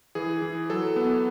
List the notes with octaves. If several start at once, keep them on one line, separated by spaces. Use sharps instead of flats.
E3 G#4
E3
F#3 A4
B3